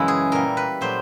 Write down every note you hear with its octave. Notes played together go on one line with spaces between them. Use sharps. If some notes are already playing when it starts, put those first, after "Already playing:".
Already playing: F#2 C#3 E3 G#3 E4
G#4
A#2 G3 A#4
B4
A#2 F#3 A3 C5